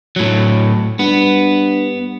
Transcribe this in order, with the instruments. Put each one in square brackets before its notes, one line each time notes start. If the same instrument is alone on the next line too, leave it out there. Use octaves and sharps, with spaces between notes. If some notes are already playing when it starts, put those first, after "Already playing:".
[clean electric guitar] A2 F#3
[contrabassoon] G2 [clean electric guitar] B3